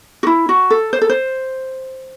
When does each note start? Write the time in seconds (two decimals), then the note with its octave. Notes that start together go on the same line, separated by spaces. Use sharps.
0.23 F#4
0.27 E4
0.49 F#4
0.70 A4
0.93 C5
1.01 A4
1.09 C5